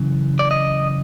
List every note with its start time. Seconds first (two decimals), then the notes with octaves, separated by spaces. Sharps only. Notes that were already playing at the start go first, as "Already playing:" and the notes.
Already playing: F#2 C#3 E3
0.39 D5
0.51 D#5